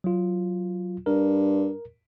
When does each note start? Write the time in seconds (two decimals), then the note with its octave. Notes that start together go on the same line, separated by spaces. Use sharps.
0.04 F#3 F4
1.06 G2 A#4